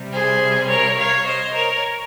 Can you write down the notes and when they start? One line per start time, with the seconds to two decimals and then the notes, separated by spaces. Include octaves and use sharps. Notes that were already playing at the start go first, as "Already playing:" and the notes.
Already playing: C3 G3
0.12 G#4 C5
0.69 A#4 C#5
0.97 C#5 F5
1.26 C5 D#5
1.54 A#4 C#5